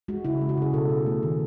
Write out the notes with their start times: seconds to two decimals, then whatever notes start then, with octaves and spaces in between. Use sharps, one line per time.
0.08 G#3 F#4
0.25 C#3 E4
0.41 G#3
0.49 F#4
0.57 C#3 G#4
0.73 B2 A4
0.90 B2
1.06 A3
1.23 D#3